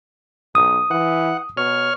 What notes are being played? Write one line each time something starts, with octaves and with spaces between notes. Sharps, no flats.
B1 D#6
E3 F#5
B2 C#5 F6